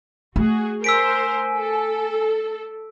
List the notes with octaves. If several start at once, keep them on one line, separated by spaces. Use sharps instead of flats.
A3 F#4 G#4
A#4 C5 G#5 E6 B6 D7
A4